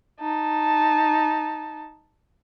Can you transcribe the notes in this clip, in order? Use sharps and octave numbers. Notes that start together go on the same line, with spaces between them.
D#4 A5